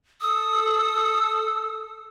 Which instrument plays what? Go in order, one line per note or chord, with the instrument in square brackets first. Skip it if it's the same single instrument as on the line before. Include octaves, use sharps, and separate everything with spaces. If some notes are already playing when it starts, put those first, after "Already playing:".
[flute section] A4 E6 [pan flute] D#6